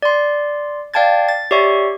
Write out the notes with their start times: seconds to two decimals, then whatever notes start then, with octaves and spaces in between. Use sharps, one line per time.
0.02 D5 C6
0.94 D5 F5 G5 A5 G#6 A6
1.29 A6
1.51 G4 C#5 D5 E5 C#6